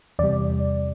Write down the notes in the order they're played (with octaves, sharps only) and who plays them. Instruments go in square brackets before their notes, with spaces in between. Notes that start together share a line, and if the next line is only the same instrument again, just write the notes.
[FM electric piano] E2 C3 G3 D5